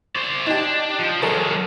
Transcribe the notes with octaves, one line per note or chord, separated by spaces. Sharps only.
C5 D5
D4 D#4 G4
F3
F#3 G#3 A4 A#4